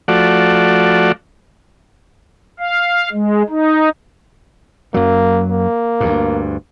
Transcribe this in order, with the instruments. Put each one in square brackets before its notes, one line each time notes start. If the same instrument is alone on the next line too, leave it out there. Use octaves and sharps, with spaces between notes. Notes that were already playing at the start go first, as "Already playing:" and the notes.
[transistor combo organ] F3 A3 F#4 D5
[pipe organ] F5
G#3
D#4
[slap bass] F#2 F#3 [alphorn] A#3
[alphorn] A#3
[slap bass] D2 G2